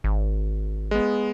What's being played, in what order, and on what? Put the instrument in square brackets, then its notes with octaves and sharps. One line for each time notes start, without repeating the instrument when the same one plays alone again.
[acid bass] G#1
[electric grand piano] G#3 B3